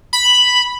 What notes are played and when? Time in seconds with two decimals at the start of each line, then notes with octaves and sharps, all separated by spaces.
0.13 B5